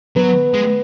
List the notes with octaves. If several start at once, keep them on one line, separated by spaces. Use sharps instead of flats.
F#3 B3
G#3